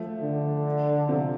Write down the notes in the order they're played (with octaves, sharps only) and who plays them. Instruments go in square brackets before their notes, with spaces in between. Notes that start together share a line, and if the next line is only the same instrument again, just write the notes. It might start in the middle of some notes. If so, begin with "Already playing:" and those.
Already playing: [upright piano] F3 A3
[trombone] D3
[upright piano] C3 F3